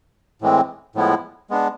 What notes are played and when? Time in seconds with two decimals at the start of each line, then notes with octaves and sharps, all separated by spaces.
0.41 A2 E3 G#3 C4
0.95 A2 F3 G#3 B3 E4
1.50 G#3 B3 D4